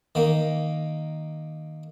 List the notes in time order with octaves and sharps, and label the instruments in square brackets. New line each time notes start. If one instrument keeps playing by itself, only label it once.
[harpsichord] D#3 A#3